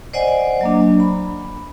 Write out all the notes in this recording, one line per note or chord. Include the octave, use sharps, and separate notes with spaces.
C5 D5 D#5 F#5 G#5
F#3 A#3 D4
B5